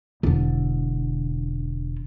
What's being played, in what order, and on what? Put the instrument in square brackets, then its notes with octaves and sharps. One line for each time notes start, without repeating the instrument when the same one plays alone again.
[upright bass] E1 D3